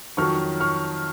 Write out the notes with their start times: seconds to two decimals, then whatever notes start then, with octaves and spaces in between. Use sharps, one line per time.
0.17 F2 D#3 F#3 C#6 F6
0.60 C#6 F6